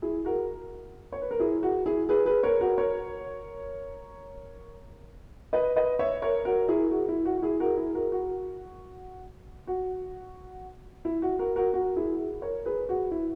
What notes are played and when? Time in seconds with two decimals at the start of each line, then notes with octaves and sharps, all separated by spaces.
0.02 E4 G#4
0.25 F#4 A#4
1.12 C#5
1.22 B4
1.31 A#4
1.40 E4 G#4
1.63 F#4
1.86 E4 G#4
2.09 G#4 B4
2.26 G#4 B4
2.43 A#4 C#5
2.61 F#4 A#4
2.78 A#4 C#5
5.53 B4 D#5
5.76 B4 D#5
5.99 C#5 E5
6.22 A#4 C#5
6.45 F#4 A#4
6.68 E4 G#4
6.91 F#4
7.09 E4
7.25 F#4
7.37 F#4
7.42 E4 G#4
7.60 F#4 A#4
7.77 E4 G#4
7.94 F#4 A#4
8.12 F#4
9.67 F#4
11.05 E4
11.22 F#4
11.39 F#4 A#4
11.56 F#4 A#4
11.74 F#4
11.96 E4 G#4
12.42 A#4 C#5
12.65 G#4 B4
12.89 F#4
13.11 E4